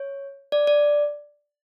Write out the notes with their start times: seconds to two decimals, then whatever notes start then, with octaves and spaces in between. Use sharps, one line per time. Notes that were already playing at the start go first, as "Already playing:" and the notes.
Already playing: C#5
0.52 D5
0.67 D5